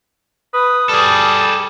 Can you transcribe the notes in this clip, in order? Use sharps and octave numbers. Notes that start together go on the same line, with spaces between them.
B4 D#6
G3 G#4 A4